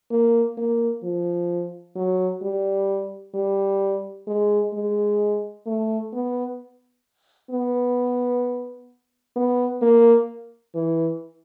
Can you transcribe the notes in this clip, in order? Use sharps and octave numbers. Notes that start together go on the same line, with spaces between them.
A#3
A#3
F3
F#3
G3
G3
G#3
G#3
A3
B3
B3
B3
A#3
E3